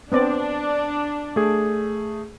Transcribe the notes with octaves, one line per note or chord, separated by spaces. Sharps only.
B3 C4 D4 D5
A3 G#4